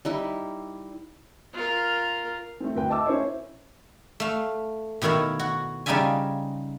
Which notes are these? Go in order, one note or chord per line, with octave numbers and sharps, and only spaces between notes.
G3 D#4 E4
F4 A#4
A3 C4
D2 B4 G5
D#5 E5 A5 D6 E6
C#4 E4 A#4 C5 C#5
A3 F5
B2 D#3 E4 C#5 F5
F#4
C#3 G3 D#4 F4 E5 G#5